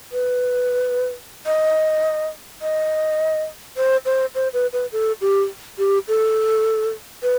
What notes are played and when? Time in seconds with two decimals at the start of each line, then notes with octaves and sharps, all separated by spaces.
0.12 B4
1.46 D#5
2.62 D#5
3.77 C5
4.05 C5
4.35 C5
4.53 B4
4.73 B4
4.92 A4
5.21 G4
5.78 G4
6.08 A4
7.23 B4